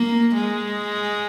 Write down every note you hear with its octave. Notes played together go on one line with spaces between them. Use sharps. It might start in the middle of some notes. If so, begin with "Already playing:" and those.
Already playing: A#3
G#3